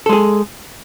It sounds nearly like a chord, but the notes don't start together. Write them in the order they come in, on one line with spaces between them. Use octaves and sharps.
A4 G#3 G#4